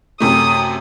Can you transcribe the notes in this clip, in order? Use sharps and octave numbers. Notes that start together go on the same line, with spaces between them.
F#2 C3 A3 D#6